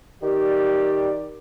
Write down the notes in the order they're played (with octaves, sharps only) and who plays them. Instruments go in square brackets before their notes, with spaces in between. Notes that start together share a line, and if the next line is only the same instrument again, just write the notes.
[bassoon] D#3 [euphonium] G4 [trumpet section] D5